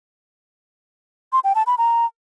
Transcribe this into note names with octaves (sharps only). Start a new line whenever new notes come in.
C6
G5
A5
B5
A#5